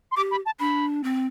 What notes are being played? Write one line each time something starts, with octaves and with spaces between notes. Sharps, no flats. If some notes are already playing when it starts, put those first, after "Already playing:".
C6
G4 D6
B5
A5
D4 B5
C4